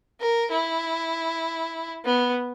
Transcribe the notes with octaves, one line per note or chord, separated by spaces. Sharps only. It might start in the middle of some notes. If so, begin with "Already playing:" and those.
A#4
E4
B3